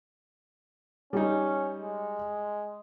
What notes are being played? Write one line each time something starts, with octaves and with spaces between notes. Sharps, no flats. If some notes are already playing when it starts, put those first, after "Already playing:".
G3 C#4 D#4
G#3